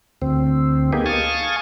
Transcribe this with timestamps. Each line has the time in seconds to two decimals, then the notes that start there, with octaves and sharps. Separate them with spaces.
0.22 D2 C4
0.93 A#3 B3 D#4 G4 G#4
1.06 F5 G#5 A5 C#6 D#6